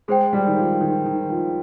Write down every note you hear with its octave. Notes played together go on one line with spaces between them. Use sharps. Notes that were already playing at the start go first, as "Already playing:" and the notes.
G#3 G#4 C5 G5
G3
D#3
F3
D#3
D#3
F3